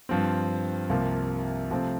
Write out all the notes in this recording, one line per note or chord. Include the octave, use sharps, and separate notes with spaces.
G2 F3 C4
C2 C3 F3 A#3
C3 F3 A3 C4